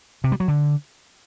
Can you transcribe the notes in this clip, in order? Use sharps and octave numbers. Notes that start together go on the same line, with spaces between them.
C3
G3
F#3
D3